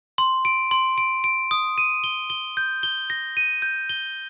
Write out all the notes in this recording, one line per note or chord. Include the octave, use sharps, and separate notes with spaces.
C6
D7
C6
D7
D7
D#6
D#7
G7
G7
G6
G7
A#6
D#7
G6
G7